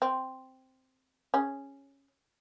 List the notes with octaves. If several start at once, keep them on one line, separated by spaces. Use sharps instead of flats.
C4
C#4 G#4